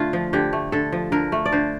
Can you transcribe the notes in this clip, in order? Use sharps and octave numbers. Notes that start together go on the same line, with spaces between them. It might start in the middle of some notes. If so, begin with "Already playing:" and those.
Already playing: D3 A3 F4
F3
D3 G4
A3
D3 A4
F3
D3 A#4
A3
D5
D3 C5